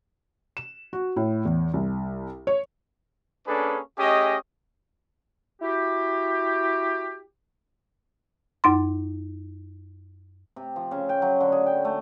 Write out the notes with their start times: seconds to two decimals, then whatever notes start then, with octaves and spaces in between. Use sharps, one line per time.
0.57 E7
0.93 F#4
1.16 A2
1.45 E2
1.74 C2
2.47 C#5
3.47 A#3 C#4 D4 G#4 A4 B4
3.98 A3 C#4 G4 G#4 D#5
5.61 E4 F#4 G4
8.64 F#2 D#4 C6
10.56 C3
10.76 F3
10.91 C#3
11.09 G5
11.22 F#3
11.40 D3
11.52 G#4
11.66 G5
11.85 A3